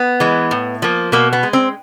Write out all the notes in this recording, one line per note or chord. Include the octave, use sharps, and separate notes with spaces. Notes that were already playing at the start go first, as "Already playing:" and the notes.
Already playing: B3
E3 G#3
A2
F3 A#3
B2 A#3
B3
G#3
C4